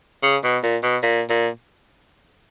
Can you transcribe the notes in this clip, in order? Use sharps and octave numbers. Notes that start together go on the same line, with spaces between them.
C#3
B2
A#2
B2
A#2
A#2